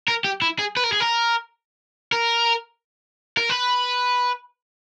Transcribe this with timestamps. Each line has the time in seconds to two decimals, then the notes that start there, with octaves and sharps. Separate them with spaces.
0.08 A#4
0.24 G4
0.42 E4
0.59 G#4
0.77 B4
0.84 A#4
0.92 G#4
1.00 A#4
2.13 A#4
3.37 A#4
3.49 B4